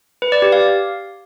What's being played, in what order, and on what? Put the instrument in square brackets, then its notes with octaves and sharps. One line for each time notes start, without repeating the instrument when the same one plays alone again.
[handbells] B4
D5
G4
F5